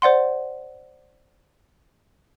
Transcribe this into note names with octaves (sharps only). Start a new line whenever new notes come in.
C5 D5 F#5 C6